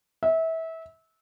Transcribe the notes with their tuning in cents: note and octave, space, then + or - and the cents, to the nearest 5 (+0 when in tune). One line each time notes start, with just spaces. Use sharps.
E5 -25